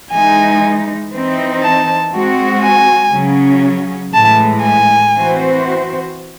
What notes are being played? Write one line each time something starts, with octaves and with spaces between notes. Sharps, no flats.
E3 G#3 D#4 G#5
E3 C4 D#4
A5
G#3 C4 F#4
G#5
C#3 F#3 C#4
A2 E3 G#3 A5
G#5
E3 C4 F#4 C5